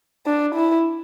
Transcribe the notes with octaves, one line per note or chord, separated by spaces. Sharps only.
D4
E4